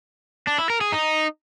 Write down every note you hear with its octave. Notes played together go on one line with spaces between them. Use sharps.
D4
E4
A#4
G#4
D#4